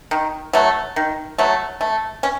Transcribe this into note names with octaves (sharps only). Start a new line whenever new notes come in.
D#3
F#3 A3
D#3
F#3 A3
A3
C#4